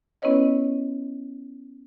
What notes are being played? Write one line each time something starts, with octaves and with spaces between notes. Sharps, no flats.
B3 C#4 E4 B4 C#5 D#5